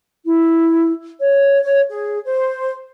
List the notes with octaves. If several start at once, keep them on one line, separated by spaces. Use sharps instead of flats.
E4
C#5
C#5
G#4
C5